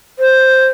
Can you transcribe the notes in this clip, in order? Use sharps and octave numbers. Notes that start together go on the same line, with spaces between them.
C5